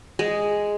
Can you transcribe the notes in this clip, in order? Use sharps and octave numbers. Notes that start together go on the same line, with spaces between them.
G#3